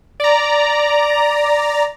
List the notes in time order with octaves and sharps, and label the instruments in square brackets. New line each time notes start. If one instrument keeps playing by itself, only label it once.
[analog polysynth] D5 A#5